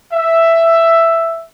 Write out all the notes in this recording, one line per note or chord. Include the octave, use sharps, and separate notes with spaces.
E5